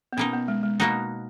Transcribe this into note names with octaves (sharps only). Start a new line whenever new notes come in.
B3
B2 A#3 C#4 D#4
B3
G#3
G#3
B2 A#3 D#4 F#4